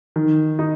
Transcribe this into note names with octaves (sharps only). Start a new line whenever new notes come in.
D#3
D#4